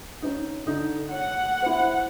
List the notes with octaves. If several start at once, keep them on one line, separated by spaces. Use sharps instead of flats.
C#4 D#4
D3 D#4
C#5 F#5
E4 C5